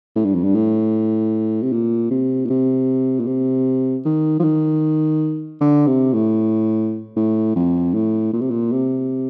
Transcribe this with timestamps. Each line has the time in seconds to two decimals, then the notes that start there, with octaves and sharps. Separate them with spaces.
0.15 A2
0.25 G2
0.35 F2
0.44 G2
0.55 A2
1.62 C3
1.72 A#2
2.11 C3
2.45 A#2
2.50 C3
3.19 A#2
3.27 C3
4.05 D#3
4.39 F3
4.44 D#3
5.61 D3
5.87 C3
6.13 A2
7.16 A2
7.56 F2
7.94 A2
8.33 A#2
8.41 C3
8.50 A#2
8.72 C3